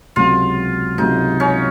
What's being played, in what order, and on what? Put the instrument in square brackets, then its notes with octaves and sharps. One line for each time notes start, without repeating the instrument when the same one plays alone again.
[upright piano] C#2 C3 F#3 [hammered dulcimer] F4
[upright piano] C#2 C3 F#3 [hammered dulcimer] D#4
[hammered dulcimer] C#4